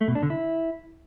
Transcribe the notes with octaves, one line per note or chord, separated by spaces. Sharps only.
A3
B2
D4
D3
E4